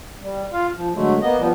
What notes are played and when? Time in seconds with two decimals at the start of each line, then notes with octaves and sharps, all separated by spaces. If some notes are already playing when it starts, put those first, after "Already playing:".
0.22 G3
0.53 F4 F5
0.75 F3
0.94 D3 F#3 G#3 A3
1.21 A#3 B3 D#5
1.38 F3 G3 B3